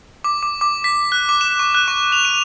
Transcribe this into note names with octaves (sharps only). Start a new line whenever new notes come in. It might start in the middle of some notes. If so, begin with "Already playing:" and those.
D6
D6
D6
B6
F#6
D6
E7
C#6
F#6
C#6
F7
D#7